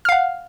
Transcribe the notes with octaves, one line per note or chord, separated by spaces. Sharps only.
F5 F#5 F6